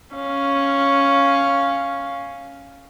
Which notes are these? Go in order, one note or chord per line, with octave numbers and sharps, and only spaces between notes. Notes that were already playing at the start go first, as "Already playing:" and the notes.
C#4 F5